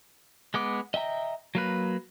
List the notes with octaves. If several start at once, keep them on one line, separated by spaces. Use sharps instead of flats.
G#3 B3 D6
D#5 E5 G5 A#5
F#3 A#3 B4